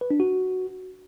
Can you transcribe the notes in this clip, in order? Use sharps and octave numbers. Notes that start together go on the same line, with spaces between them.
B4
D4
F#4